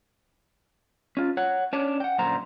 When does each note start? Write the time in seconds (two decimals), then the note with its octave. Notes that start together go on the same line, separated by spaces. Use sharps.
1.17 C#4 F4
1.37 C#5 F#5
1.73 C#4 D4 C#5 D5
2.00 F#5 G5
2.18 F#2 A#2 D3 C5 A#5